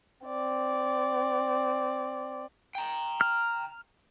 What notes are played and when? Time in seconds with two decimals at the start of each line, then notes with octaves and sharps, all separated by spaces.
0.26 C4 D5
2.75 G5 A#5
3.21 F6